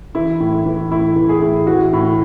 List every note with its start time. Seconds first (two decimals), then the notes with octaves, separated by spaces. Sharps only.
0.15 E3 E4
0.40 A2
0.52 E4
0.66 E3
0.91 A2 E4
1.16 E3
1.29 G#4
1.42 A2
1.67 E3 F#4
1.93 A2